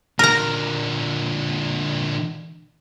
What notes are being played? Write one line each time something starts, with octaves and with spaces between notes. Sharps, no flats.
A#2 D3 A#4 A#5